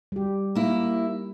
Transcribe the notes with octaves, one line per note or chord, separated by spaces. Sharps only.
G3 G4
A#3 E4